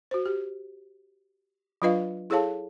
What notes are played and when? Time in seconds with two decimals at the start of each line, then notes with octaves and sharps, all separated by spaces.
0.11 F#4 C5
0.26 G4
1.82 F#3 D4 F4 B4 D#5 F5
2.30 E4 G#4 A4 C#5 F5 A5